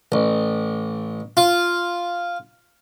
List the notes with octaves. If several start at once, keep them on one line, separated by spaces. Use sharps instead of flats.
A1
F4